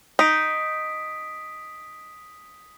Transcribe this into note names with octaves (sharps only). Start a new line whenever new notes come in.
D#4 D#6 B6 D7